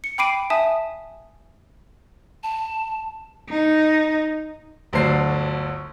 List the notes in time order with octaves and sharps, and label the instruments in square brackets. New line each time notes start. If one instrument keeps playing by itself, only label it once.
[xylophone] C#7
G5 B5 D6 C7 D7 D#7
E5 G#5 A5 D#6
[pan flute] A5
[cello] D#4
[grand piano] G1 D2 F#3 D4 C5 C7